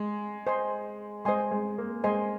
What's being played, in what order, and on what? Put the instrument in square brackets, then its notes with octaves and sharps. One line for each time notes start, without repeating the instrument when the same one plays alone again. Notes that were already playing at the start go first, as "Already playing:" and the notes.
Already playing: [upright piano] G#3
[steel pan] C5 D#5 G#5 C6
[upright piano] G#3 [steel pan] C5 D#5 G#5 C6
[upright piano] G#3
A#3
[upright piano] G#3 [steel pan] C5 D#5 G#5 C6